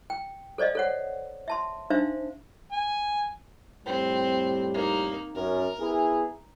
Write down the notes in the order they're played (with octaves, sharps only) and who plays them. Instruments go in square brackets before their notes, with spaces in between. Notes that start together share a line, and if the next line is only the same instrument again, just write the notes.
[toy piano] G5
A4 C5 D5 D#5 F5
A4 C#5 F#5
E5 A5 C6
D4 D#4 C5 E5 F5
[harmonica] G#5
[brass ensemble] F2 A2 G3 [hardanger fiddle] C4
[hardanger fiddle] A#3 D#4
[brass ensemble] F#2 [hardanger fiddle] A#4
[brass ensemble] B3 E4 G#4